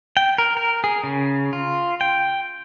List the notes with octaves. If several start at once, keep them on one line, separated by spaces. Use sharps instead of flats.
G5
A#4
A#4
G#4
C#3
F4
G5